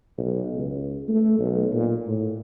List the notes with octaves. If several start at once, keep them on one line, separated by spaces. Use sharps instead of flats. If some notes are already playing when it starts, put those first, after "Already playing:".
B1
C#2
A3
B1
A#2
A2